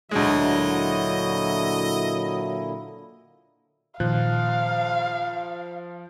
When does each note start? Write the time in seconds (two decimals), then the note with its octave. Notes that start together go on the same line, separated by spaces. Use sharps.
0.11 D2 A#2 D3 F#3 G#3 E4 D#5
4.00 A#2 D#3 F3 F5 F#6